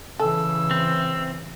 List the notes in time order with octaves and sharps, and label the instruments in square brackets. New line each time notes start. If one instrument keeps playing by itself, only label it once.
[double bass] C#3 E3 [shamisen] A4 [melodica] E6
[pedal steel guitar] C4